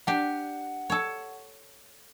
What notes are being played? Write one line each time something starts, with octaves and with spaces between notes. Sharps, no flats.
D4 G4 F#5
A4 C#5